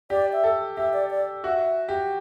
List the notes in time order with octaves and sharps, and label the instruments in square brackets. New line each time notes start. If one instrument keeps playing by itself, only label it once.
[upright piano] G4 [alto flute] D5
[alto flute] E5
[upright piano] A4
[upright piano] G4 [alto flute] E5
[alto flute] D5
D5
[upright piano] F#4 [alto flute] E5
[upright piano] G4